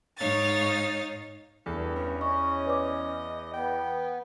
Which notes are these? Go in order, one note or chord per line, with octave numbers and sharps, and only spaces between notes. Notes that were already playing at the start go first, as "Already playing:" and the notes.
G#2 D#4 C#5 F5 A6
E2 G2 A4
C#4
C#4 D#5 C#6
B4 D5 D6
B3 G5